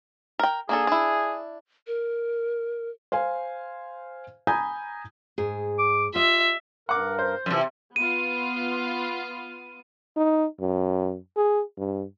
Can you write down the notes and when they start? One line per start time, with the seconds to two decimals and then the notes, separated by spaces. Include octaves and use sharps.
0.39 A#4 G5
0.69 A#3 D4 G#4 A4
0.87 D4 E4
1.87 A#4
3.12 C5 F5 G#5
4.47 G#5 A#5 B5 D#6 G6 G#6
5.38 G#2 G#4
5.78 D6
6.15 F4 G4 D#5 E5
6.89 G2 A#4 F#5 D6
7.19 C5
7.46 F#2 C3 E3 F3
7.96 B3 F4 D#7
10.16 D#4
10.60 F#2
11.36 G#4
11.77 G2